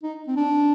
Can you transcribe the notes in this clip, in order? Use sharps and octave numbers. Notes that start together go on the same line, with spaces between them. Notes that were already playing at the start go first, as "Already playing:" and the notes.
D#4
C4
D4